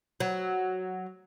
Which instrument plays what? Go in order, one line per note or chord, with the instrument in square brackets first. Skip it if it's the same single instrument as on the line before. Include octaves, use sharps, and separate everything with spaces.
[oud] F#3